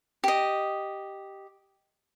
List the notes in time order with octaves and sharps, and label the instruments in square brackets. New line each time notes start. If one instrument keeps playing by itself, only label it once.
[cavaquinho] G4 D#5